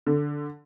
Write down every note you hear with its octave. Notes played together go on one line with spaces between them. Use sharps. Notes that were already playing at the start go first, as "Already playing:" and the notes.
D3